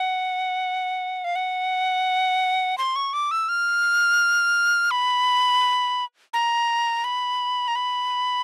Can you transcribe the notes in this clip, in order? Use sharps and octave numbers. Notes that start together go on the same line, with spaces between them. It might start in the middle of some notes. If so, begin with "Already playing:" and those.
Already playing: F#5
F5
F#5
C6
C#6
D6
E6
F6
B5
A#5
B5
A#5
B5